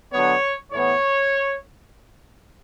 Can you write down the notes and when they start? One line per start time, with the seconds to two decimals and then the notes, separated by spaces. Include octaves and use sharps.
0.12 D3 F#3 B3 C#5
0.71 A2 E3 B3 C#5